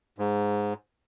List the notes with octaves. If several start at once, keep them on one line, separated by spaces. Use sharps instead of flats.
G#2